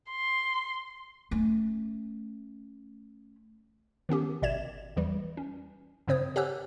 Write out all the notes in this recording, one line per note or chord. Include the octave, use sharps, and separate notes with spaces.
C6
A3 C#4
D#3 B3 C#4 G4
G#1 B2 D5 E5 G#6 E7
E2 E3 G3
C#4
G2 C#3 C4 C5 D#6 G#6
G4 C#5 F#5 G#5 E6 F#6